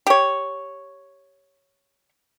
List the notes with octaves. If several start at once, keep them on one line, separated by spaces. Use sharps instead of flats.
G4 C#5